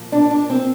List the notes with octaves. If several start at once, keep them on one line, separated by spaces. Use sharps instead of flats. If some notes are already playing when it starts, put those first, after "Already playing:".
Already playing: A#2 F3 A#3
D4
D4
C4